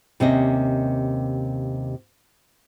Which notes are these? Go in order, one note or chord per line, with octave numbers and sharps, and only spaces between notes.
D#2 C3 A#3 C#4 D#5